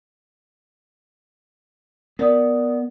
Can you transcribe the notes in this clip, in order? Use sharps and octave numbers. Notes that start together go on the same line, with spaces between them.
B3 A#4 D5 D#6